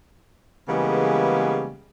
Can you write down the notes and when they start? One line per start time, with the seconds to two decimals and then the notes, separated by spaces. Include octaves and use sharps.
0.69 C#3 E3 G3 G#3 A#3 B3